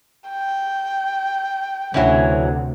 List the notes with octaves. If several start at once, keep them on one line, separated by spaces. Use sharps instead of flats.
G5
D2 C3 E3 F#3 C#4 E4